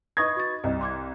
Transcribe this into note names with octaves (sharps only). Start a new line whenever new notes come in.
D#4 B4 C#6 D#6 G#6 A#6
F#4 C#6 A6
C2 D#5
C6 D6 G#6